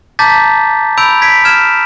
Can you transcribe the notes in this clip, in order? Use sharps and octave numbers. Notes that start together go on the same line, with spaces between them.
A5 A#5 D6 G6 A6 B6
B5 E6 G6 D7 F7
G#6 B6 D7
F6 G#6 E7